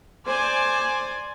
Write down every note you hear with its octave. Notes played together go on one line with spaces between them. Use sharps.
C5 D5 G#5